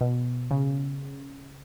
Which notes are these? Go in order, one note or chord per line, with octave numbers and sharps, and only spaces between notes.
B2
C#3